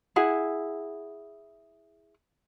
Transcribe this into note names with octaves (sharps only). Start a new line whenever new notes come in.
E4 G#4 F#5